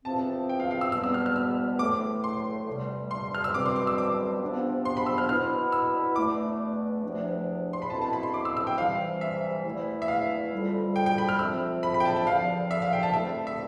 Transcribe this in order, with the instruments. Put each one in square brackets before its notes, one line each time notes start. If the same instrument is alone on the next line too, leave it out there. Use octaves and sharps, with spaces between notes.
[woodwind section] E2 C3 F3 C4 [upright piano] A5
[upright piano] G5
F5
F5
E6
[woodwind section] E2 B2 G3 B3 [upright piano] E6
[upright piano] E6
F6
F6
E6
[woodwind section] A2 E3 A3 [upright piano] D6
[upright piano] C6
[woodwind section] E2 C3 G3
[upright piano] C6
F6
E6
[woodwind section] C2 B2 G3 C4 [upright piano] D6
[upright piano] C6
D6
E6
D6
[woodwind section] C3 F3 B3 D4
[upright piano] C6
B5
E6
F6
[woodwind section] B2 B3 E4 [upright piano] F6
[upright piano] E6
[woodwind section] E2 B2 A3 D4 [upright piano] D6
[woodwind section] E2 C3 F3 A3 D4
[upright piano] C6
B5
[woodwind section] B2 A3 C4 E4 [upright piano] A5
[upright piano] A5
B5
C6
D6
E6
E6
G5
[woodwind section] C3 E3 G3 [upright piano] F5
[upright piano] E5
[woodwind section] E2 B2 A3 E4
[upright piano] E5
F5
[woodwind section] F2 D3 G3
[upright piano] G5
G5
B5
F6
[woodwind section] F2 C3 F3 C4 [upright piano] E6
[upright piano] B5
B5
G5
A5
A5
[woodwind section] E2 D3 F3 [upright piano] F5
[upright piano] E5
F5
G5
A5
[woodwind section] G2 D3 A3 C4 E4 [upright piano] E5
[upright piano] E5